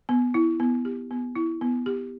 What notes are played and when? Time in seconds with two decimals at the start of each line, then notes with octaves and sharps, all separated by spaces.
0.09 B3
0.34 E4
0.60 B3
0.85 G4
1.11 B3
1.35 E4
1.61 B3
1.86 G4